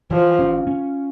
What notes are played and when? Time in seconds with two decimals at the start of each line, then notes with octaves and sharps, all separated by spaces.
0.11 E3 F3
0.39 C#4
0.67 C#4